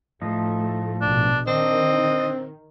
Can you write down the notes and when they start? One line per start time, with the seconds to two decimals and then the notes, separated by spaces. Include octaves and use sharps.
0.21 A2 F3 A3 D#4
1.02 A#1 B2 D4
1.47 D#3 C4 D4 D#5